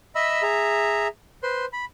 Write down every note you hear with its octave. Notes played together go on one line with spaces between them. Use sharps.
D#5 E5 B5 E6
G#4 E5 A#5
B4 C5 C6
B5